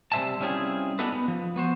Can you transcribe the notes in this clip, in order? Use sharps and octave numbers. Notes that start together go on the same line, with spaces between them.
C3 G3 C5 E5 G#5 A5
G3 C4 C#4 E4 F4 G#4
B3 D4 D#4 F#4 A4 B4
B3
F3
B3 F#4 C5